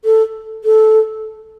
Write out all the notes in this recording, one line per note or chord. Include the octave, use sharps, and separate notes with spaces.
A4
A4